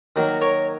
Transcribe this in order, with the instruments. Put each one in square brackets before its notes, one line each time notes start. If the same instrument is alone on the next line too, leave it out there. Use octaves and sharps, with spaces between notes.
[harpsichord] D#3 F#3 A#3 [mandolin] F#4 A#4
[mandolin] A#4 C#5